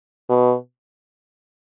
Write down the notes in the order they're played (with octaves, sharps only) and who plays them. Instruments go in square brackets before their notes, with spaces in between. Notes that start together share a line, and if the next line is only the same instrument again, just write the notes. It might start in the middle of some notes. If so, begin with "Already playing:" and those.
[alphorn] B2